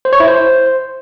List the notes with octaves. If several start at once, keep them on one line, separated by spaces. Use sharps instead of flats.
C5
C#5
E4
C5